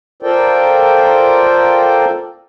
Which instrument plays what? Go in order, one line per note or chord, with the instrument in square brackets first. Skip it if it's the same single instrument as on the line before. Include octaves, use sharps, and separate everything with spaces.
[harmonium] F4 A4 A#4 C5 D5 G5